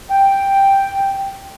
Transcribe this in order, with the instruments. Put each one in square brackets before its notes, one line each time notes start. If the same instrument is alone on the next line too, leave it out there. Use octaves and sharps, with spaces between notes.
[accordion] G5